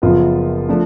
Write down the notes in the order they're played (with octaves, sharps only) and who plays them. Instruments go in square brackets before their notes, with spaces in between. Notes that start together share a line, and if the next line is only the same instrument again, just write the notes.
[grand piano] F#1 F#2 F3 B3 F4
F3 A3 D4